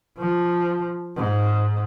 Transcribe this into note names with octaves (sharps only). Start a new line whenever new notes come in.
F3
G#2